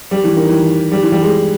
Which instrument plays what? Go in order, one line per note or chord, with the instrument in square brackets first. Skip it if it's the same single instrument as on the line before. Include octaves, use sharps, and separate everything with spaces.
[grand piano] G3
E3
D#3
E3
G3
E3
G3
G#3